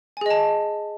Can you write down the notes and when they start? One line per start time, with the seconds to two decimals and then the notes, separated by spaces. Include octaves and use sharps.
0.17 G#5
0.21 G#4
0.26 D#5
0.30 A5